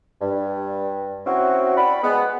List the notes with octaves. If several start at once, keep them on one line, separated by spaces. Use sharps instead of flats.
G2
C4 C#4 E4 F#4
D5 F#5 G5 B5
G#3 B3